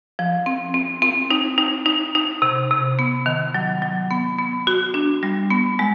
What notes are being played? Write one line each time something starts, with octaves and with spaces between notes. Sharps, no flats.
F3
C4
C4
C4
D#4
D#4
D#4
D#4
C3
C3
B3
D#3
F#3
F#3
B3
B3
F#4
D4
G3
B3
G#3